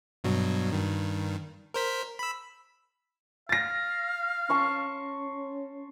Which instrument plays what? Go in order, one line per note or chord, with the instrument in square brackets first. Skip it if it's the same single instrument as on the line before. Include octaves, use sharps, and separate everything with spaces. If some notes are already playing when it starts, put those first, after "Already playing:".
[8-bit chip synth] G2 B2 F#3
G2 D#3
A#4 C5 B6
B5 E6
[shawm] F5 [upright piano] A6 A#6
[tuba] C#4 [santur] A5 C6 C#6